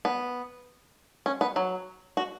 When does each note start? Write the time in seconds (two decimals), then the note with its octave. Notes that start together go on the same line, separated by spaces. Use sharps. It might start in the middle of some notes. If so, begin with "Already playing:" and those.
0.05 B3
1.26 C#4
1.41 B3
1.56 F#3
2.17 F#4